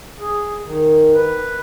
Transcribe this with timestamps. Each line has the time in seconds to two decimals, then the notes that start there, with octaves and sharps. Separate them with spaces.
0.19 G#4
0.65 D#3
1.14 B4